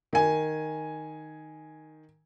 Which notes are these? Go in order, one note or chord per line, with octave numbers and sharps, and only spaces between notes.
D#3 G#5